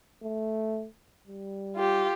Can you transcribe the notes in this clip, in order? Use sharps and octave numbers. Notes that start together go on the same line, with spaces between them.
A3
G3
F4 G4